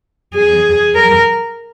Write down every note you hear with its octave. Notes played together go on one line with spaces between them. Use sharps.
G#4
A#4